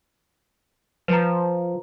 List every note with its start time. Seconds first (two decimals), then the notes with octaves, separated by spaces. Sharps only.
1.08 F3 B4 A#5